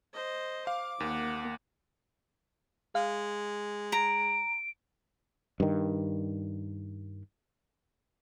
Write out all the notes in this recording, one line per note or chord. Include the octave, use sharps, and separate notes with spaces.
C5 D#5
F5 D6
D#2 A#3 F#5
G#3 F5
A#5 D7
G2 D#3